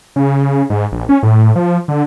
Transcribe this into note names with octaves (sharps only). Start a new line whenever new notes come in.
C#3
G#2
A#1
C#4
A2
F3
D3